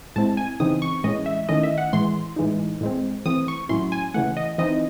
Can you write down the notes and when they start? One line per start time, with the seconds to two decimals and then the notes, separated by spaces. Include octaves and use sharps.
0.16 A2 G#3 C4 E4 A5
0.37 G#5
0.60 C#3 E3 C4 D#4 D#6
0.82 C#6
1.04 A2 E3 G#3 C#4 D#5
1.26 E5
1.49 D#3 A3 C#4 E4 D#5
1.63 E5
1.78 F#5
1.93 A2 E3 G#3 C6
2.36 A2 E3 G#3 D#4
2.81 A2 G#3 C4
3.26 E3 A3 C4 D#6
3.48 C#6
3.69 A2 F#3 C#4 E4 C6
3.92 G#5
4.14 C#3 E3 A3 F#5
4.37 D#5
4.58 E3 C4 D#4 D#5